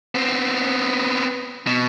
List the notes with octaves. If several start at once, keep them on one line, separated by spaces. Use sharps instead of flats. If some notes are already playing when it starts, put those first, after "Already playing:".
B3 C4
B2